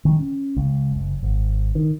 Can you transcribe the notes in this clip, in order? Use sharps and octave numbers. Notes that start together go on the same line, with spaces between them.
D#3
C#4
C#2
F#1
G#1
D#3